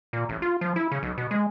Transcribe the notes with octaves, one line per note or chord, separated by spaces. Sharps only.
A#2
A1
F4
F3
E4
C#3
B1
B2
G#3